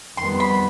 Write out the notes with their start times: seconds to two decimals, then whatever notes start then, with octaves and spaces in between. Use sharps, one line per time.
0.17 F2 D#3 G3 B3 C6
0.40 B5